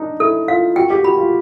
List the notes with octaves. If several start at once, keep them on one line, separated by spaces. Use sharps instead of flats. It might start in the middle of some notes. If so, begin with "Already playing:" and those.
Already playing: D4 D#4
E4 A4
F4 F5
F#4 G5
G4
F#4 B5
F4